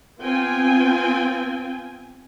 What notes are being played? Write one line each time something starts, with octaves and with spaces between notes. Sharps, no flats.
B3 C4 F4 G5 G#5